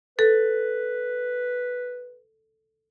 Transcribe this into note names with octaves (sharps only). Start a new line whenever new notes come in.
A4 B4